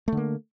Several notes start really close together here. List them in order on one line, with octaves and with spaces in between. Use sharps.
A3 D3 A#3